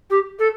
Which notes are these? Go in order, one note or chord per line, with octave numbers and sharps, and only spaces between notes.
G4
A4